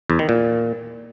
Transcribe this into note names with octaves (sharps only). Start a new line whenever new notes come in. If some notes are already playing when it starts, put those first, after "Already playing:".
E2
D#3
A#2